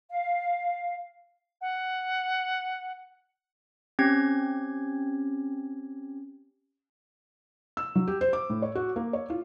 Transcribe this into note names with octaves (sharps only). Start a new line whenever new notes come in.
F5
F#5
C4 C#4 G4 G#6
E6
F#3
G4
C5
D6
A2
C#5
F#4
A#3
C#5
F4